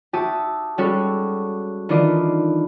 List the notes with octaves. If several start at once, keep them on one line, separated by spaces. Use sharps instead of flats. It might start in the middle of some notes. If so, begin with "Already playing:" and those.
F#4 G4 E5 A5 D#6
G3 G#3 C#4 F#4 A4
D#3 E3 D4 F4 D5 D#5